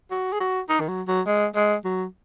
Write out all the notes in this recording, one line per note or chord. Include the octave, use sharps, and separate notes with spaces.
F#4
G#4
F#4
D#4
D#3
F#3
F#3
G#3
G#3
F#3